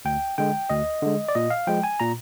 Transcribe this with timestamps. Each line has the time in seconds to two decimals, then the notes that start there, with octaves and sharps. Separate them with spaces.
0.05 D2 G5
0.38 D3 G#3 G5
0.70 D2 D#5
1.02 D3 G#3
1.28 D5
1.35 A#2 D#5
1.50 F5
1.67 F3 G#3 G5
1.84 G#5
2.00 A#2 A#5